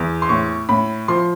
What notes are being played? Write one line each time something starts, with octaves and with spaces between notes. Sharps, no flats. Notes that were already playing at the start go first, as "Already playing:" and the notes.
Already playing: E2
C6
A2 C#6
A2 B5
F3 C6